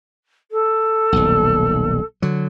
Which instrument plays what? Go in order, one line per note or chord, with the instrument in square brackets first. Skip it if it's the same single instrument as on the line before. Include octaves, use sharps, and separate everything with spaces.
[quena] A4
[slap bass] D#1 B1
D3 F#3